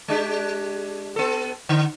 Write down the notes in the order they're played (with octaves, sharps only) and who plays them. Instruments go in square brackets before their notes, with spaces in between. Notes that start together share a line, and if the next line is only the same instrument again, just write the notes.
[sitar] G#3 D4 G4
B3 A4
D3